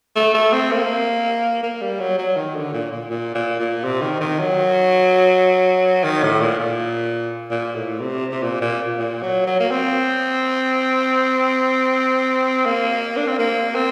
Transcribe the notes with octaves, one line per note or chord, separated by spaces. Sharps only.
A3
A3
C4
A#3
A#3
G3
F#3
F#3
D#3
D3
A#2
A#2
A#2
A#2
A#2
C3
D#3
D#3
F#3
D#3
A2
A#2
A#2
A#2
A2
C3
C3
A#2
A#2
A#2
F#3
F#3
A#3
C4
A#3
D4
C4
A#3
C4